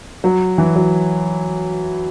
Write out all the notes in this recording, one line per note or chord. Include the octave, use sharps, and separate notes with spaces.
F#3
E3
F#3